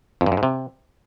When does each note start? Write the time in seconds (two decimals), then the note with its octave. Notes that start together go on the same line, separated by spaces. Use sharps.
0.21 F2
0.26 G2
0.32 F#2
0.37 G#2
0.43 C3